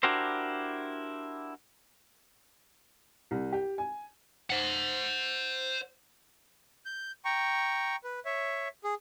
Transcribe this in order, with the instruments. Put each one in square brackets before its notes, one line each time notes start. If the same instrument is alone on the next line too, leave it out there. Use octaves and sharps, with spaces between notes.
[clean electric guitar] D4 E4 F#4 G4 A#4 C5
[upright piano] C2
G4
G#5
[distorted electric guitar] C5 F#5
[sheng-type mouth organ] G6
G5 A#5 C#6
B4
C#5 E5
G#4